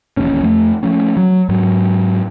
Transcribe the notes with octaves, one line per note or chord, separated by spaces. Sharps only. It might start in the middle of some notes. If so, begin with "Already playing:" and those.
E1 A#1 D#2 C#4
F2 A3
F3 A3 C#4
F#3
G#2 F#3